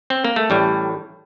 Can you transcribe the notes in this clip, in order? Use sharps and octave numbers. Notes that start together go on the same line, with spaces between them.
C4
A#3
A3
A1 A2 G3